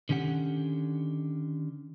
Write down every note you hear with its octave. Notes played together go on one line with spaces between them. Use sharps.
D3 D#3 C#4 G4 F#5